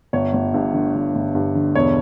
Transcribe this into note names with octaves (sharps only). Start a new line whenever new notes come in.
G1 C#5
G1
G2
D3
G1
G1
G2
D3
E1 C#5